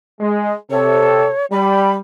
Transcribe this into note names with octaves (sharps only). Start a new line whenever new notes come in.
G#3
C3 A4 C#5
G3 B5